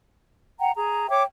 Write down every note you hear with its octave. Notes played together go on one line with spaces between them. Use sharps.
F#5 G5 A#5
G#4 A#5
C#5 E5 G5 D6